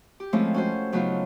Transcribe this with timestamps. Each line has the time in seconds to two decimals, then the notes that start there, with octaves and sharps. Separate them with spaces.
0.20 G4
0.33 F3 G#3 A3 C4 C#4 E4
0.54 C#4 F#4 C5
0.92 C#3 F#3 A3 B3 D#4 F4